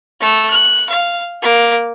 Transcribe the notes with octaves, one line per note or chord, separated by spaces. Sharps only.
A3 E6
F#6
F5
A#3 D6